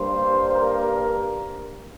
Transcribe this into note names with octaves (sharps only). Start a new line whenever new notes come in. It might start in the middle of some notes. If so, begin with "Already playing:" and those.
Already playing: G2 G3 A#3 C5
A#4